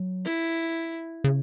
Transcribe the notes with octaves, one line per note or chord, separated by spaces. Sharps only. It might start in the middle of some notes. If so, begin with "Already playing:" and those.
Already playing: F#3
E4
C#3